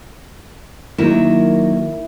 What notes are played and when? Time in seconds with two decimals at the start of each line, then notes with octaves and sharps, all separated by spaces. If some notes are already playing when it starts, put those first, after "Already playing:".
0.98 D#3 F#3 A#3 E4